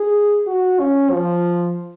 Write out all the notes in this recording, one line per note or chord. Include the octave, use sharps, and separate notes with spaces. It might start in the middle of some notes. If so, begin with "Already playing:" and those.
Already playing: G#4
F#4
C#4
F3